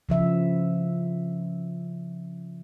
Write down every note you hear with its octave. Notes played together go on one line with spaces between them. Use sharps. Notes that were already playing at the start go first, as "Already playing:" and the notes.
C#3 F3 E5